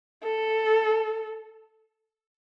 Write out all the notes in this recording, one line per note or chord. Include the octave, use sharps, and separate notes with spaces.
A4